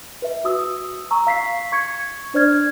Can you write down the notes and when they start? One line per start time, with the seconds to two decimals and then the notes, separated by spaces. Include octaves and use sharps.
0.22 B4 E5
0.44 F#4 D#6 E6
1.11 A#5 C#6 E6
1.27 F5 B6 C7
1.72 C#6 G#6 C#7
2.34 D4 C5 D5 F6 G#6